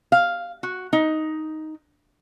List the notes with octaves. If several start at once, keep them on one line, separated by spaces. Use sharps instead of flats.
F5
F#4
D#4